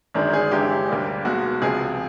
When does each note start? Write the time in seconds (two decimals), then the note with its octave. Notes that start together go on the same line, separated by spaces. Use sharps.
0.14 G1 F#2 D#3 G#3 D4
0.33 G#4
0.51 G1 G2 E3 G#3 G4
0.89 D2 D3 G3 A#3
1.25 B1 B2 G#3 F#4
1.62 C#2 C3 F3 G#4